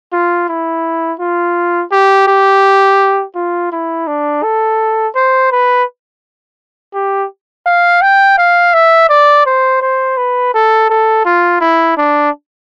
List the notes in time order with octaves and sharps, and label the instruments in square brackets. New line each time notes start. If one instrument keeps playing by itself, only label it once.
[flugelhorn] F4
E4
F4
G4
G4
F4
E4
D4
A4
C5
B4
G4
F5
G5
F5
E5
D5
C5
C5
B4
A4
A4
F4
E4
D4